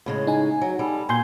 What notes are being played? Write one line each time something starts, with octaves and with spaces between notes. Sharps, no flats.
A2 C#3 G#3
D#4 G#5
F#3
G3 A4
A#2 G#5 C6 G6